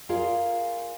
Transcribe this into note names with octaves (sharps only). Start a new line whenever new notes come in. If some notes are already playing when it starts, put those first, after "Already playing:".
F4 G#4 A#4 D5 F5